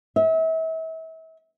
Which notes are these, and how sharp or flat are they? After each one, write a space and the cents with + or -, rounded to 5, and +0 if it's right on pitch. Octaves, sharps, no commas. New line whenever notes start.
E5 -35